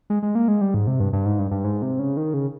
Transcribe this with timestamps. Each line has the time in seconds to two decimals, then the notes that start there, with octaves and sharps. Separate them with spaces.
0.10 G#3
0.23 G#3
0.35 A#3
0.48 G#3
0.61 G3
0.74 G#2
0.87 C3
1.00 G2
1.13 G2
1.26 G#2
1.39 G2
1.51 G2
1.64 G#2
1.82 C3
1.99 C#3
2.17 D#3
2.34 C#3